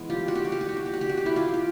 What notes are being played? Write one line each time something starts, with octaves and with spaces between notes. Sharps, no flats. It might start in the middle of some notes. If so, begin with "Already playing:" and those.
Already playing: E3 G#3 B3
F4 G4
F#4
G4
F#4
G4
F#4
G4
F#4
G4
F#4
G4
F#4
G4
E4 F#4
F4 G4
G4